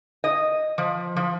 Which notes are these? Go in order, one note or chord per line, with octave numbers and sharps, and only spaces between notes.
D#5
F3
F3